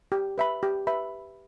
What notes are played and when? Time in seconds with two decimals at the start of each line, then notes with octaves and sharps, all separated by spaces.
0.12 G4
0.38 B4 E5 B5
0.63 G4
0.87 B4 E5 B5